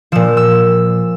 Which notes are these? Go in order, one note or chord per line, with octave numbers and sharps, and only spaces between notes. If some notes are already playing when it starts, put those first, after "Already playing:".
A#2 F3 E6
E6